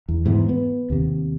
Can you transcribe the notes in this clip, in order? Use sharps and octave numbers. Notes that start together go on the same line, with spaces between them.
E2
G#2 E3 B3
B3
D#2 C3